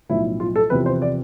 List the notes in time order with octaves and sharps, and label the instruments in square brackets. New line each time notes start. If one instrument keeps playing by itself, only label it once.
[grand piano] B1 A2 F3 E4
F4
A4
E2 C3 F3 B4
C5
D5